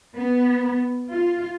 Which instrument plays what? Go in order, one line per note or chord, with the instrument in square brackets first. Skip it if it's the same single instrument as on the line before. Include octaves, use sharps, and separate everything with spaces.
[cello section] B3
F4